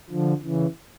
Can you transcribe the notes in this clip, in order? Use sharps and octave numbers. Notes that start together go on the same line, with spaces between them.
D3 F3
C#3 E3